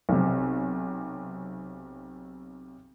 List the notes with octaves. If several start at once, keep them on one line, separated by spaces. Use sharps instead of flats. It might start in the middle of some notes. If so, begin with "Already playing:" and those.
B1 C3